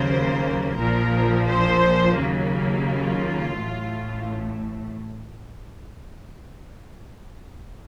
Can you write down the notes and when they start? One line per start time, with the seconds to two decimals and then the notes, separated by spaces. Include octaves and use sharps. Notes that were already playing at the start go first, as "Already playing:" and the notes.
Already playing: D#2 C#3 F#3 A#3 C5
0.79 A#1 A#2 F3 A#4
1.48 C5
2.17 D#2 C#3 F#3 A#3
2.86 F4
3.56 A1 A2 A3